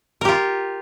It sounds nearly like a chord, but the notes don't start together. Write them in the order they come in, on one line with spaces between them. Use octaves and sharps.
A#4 G4 F4